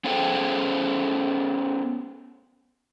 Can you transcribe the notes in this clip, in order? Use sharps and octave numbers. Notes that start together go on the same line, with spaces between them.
B3 C#4 G#4 A4 C5 G5